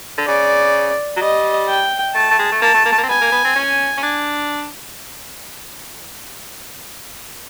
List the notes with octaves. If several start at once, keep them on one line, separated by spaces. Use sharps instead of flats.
D3
C#3 D5
F#3
G3 D#5
G5
A3 A5
A3
G#3
A3
A#3 A5
A3
A#3
A3
A#3
C4
B3 G#5
A#3
B3
C4
C#4
C#4
D4